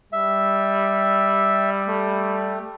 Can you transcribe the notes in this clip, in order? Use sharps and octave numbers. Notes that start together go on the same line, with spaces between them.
G3 E5
A3